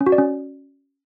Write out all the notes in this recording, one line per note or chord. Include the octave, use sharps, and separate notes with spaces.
C#4
F#4
D5
C#4